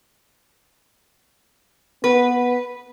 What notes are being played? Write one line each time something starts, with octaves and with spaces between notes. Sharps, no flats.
B3 B4